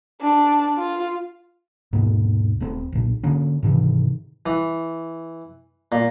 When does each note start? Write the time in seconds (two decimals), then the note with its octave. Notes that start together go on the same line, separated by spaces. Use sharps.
0.21 D4
0.78 F4
1.93 D#2 G#2 B2 A#3
2.60 D#1 A3 C4
2.92 B1 A#2
3.23 D3 A#3 C#4
3.63 G#2 C3 D#3 E3
4.46 E3
5.92 A#2